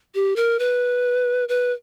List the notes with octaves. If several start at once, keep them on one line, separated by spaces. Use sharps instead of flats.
G4
A#4
B4
B4